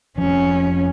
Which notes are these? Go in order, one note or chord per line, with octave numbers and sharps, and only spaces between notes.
F1 F3 C#4